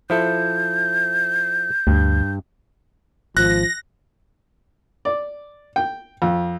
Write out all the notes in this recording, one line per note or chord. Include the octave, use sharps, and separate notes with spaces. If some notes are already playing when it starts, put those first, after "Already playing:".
F3 E4 A4 G6
D2 G2
G#1 F3 F#6 A#6
D5
G5
F2